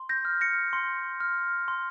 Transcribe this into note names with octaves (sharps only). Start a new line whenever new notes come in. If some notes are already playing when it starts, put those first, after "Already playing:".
Already playing: C6
G6 A#6
F6
A#6 C#7
C6
F6
C6